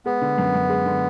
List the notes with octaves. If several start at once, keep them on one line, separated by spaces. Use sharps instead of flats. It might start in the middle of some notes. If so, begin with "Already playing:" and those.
G#3 B3
D3
F#2
F#2
G#3
D3